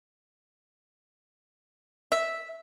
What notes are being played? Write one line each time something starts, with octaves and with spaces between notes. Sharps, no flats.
E5